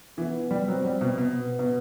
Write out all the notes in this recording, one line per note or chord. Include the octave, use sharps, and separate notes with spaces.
E3 B3
G3
F#3 C4
G3
B2
B2 B3
B2